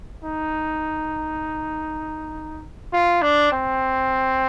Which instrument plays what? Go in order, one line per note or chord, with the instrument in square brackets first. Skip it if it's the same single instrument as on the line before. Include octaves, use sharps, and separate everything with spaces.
[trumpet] D#4
F4
D4
C4